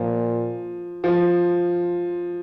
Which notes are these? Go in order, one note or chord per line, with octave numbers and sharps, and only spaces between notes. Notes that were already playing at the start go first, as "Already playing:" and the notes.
Already playing: A#2 F3
F3